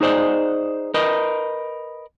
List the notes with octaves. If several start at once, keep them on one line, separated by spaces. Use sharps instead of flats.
D#4 G#4 C5 D5 D#5
A#4 B4 D#5